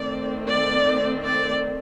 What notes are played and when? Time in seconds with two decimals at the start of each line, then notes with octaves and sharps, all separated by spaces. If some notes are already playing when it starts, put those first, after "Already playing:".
Already playing: D#3 A3 C4 D5
0.48 D5
1.25 D5